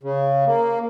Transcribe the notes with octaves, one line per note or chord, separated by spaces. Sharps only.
C#3
A#3